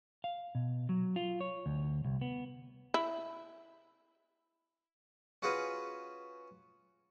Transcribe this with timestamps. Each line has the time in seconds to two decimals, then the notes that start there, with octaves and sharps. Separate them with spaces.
0.24 F5
0.55 B2
0.89 F#3
1.16 F4
1.41 C#5
1.66 D2
2.05 C2
2.21 B3
2.94 E4
5.42 C#4 F4 F#4 G#4 B4